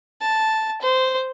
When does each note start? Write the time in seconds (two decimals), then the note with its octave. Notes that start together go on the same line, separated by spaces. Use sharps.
0.21 A5
0.82 C5